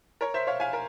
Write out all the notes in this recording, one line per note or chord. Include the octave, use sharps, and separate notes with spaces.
A#4 C#5
C5 E5
C#5 F5
F5 G#5
A#4